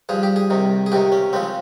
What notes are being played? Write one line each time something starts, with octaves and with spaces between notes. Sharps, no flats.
G2 F3 G#4
G4
G#4
C2 C3 D#3
G#4
C#2 C3 D#3 G4
C#4
C#2 C#3 F3 C4